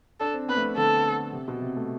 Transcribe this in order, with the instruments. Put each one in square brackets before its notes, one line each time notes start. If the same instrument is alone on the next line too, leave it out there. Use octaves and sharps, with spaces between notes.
[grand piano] D4 [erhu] A4
[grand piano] C4
[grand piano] B3 [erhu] B4
[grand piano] A3
B3
[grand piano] D3 [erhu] A4
[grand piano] C3
B2
C3
A3